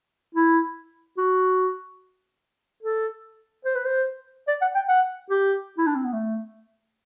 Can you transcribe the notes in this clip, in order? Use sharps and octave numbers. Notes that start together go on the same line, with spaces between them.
E4
F#4
A4
C5
B4
C5
D5
F#5
G5
F#5
G4
E4
D4
C4
B3
A3